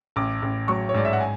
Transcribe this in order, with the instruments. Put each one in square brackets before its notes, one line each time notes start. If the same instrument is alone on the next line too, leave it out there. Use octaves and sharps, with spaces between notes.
[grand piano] A1 D6
A1
F#3 C#6
C#5
G#2 D5
E5
F#5
G#5